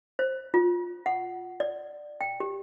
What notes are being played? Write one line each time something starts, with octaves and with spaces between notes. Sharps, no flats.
C5
F4
F#5
D5
G5
G4